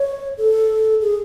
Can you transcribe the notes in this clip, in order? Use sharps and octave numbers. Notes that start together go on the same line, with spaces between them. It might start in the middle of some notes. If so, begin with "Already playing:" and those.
Already playing: C#5
A4
G#4